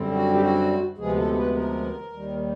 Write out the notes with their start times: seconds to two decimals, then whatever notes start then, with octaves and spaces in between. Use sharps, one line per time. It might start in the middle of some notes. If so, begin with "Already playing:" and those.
Already playing: F#2 D3 G3 C4
0.12 F#4
0.34 G4
0.40 F#4
0.98 D2 C3 F3 G#3 B3 G#4
1.16 A4
1.36 B4
1.55 A#4
2.13 D#2 D#3 G3